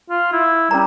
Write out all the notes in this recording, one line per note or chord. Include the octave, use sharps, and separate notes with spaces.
F4
E4
G3 C#4 A#4 A#5